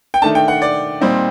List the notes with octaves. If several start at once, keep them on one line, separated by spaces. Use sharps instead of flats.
G5
D#3 A3 D4 A5
G5
F#5
D5
A#2 G3 C4 D#4